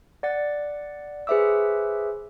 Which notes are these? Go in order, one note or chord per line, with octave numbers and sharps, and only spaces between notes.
D5 F#5 A6
G#4 B4 C5 E5 D6 E6